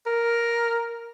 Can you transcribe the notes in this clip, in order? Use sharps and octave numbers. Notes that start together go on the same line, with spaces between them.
A#4